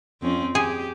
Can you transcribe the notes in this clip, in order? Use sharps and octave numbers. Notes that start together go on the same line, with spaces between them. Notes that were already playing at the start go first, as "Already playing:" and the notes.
F2 C4 C#4
G4 G#4